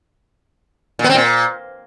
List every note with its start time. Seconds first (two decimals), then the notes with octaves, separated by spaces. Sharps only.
0.99 A#2
1.04 B3
1.09 C4
1.15 A#2